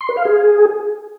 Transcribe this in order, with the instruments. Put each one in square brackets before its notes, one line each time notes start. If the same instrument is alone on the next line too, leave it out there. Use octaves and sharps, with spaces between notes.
[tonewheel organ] C6
B4
F5
G#4